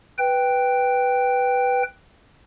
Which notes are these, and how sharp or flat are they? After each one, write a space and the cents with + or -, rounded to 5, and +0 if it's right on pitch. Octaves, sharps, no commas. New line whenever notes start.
B4 +0 G5 +0